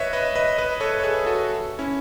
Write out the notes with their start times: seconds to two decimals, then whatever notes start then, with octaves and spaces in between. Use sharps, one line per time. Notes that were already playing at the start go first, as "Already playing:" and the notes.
Already playing: B4 C#5 D#5 E5
0.13 B4 D#5
0.36 B4 D#5
0.58 B4 D#5
0.80 A4 C#5
1.00 C#5
1.03 G#4 B4
1.26 F#4 A4
1.79 C#4 E4